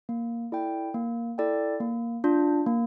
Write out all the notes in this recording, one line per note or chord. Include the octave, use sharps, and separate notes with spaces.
A#3
E4 A4 D5 G5
A#3
E4 A4 D5 G5
A#3
D4 F4
A#3